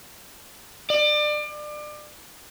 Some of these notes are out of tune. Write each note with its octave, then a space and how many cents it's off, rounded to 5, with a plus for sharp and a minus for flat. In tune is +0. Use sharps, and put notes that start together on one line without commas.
D5 +30